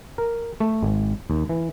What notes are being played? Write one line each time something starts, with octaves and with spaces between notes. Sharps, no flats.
A#4
A3
G#1
D#2
E3